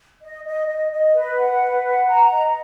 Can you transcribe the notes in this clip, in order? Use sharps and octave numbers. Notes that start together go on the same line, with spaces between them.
D#5
D#5
D#5
D#5
B4
F#5
B4
F#5
A#5
D#5